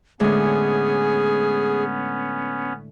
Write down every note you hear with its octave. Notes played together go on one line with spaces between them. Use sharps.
A2 D3 G#3 B3 C#4 G#4